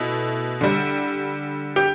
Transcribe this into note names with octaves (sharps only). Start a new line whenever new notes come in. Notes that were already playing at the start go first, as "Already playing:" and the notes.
Already playing: B2 A3 E4
D3 G3
G4